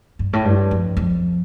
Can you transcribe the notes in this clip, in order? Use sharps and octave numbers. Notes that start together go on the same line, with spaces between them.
G2
A2
G2
F2
F2